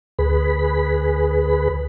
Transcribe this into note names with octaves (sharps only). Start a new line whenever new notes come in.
D2 G#4 B4 B5